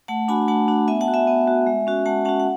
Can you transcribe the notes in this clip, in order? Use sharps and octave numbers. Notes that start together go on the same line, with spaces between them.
A3 F#5 A5
D4 F#4 G#5 B5
A3 F#5 A5
D4 F#4
B3 E5 G#5
F#5 A5
F#4
E5 G#5
B3
F#4
G#3
C#4 F#4
G#3 F#5 A5
C#4 F#4 F#5 A5
F#5